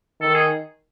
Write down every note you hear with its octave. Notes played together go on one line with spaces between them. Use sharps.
D#3 A4
G#4